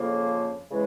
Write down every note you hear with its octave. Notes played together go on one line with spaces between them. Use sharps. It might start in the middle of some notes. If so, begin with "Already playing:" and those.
Already playing: F2 C#3 F3 A#3
C#3 E3 G#3